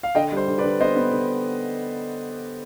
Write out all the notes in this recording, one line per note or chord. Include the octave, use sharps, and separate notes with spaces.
F5
D3 D#5 G5
G3 C5
D3
B4 D5
D3
B3 C5 D#5
B3
D3